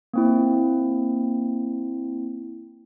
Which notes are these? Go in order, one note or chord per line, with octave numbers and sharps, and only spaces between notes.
A#3 C4 E4